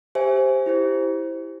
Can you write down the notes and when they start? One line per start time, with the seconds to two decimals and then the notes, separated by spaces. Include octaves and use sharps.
0.15 G4 C5 E5 G#5
0.66 E4 G4 C5